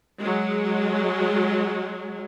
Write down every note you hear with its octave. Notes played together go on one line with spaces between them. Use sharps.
F#3 G#3